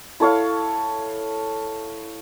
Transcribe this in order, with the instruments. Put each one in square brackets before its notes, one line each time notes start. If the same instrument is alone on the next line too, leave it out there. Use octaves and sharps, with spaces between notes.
[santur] E4 A4 C#5 F5